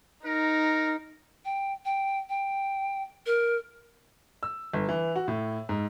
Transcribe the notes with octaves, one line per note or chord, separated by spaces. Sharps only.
D#4 A#4
G5
G5
G5
A#4
E6
G1
E3
F#4
A2
G#2